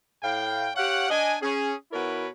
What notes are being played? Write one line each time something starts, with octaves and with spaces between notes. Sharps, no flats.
A2 F5 G5
G4 C#5 F5 F#5
D4 D#5 G#5
C#4 G#4
B2 E4 F#4 A#4 B4 C#5